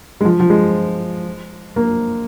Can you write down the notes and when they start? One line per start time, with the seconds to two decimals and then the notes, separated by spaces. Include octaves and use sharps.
0.21 G#3
0.25 F3
0.39 F3
0.50 G#3
1.76 A#3